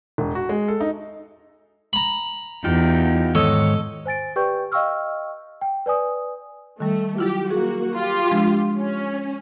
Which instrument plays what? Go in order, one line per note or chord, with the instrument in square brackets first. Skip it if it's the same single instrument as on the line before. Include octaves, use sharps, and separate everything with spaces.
[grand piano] E1
F#4
G#3
A4
D#4
[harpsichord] A#5 B5
[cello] E2 [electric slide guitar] D#4 F4 G4
[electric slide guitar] G#2 D#3 C#5 [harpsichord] A4 D#5
[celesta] C5 G#5 A6 D7
G4 B4 D5 G5 C#6 G6
D#5 F5 G5 C#6 E6 F6
G5
B4 D5 G#5 D#6
[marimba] D#3 G3 [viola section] A3
[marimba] F#3 E4 F4 [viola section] G4
[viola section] A#3 F#4 [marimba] G#4
[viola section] F4 G4
[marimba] F3 G#3 D4
[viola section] C#4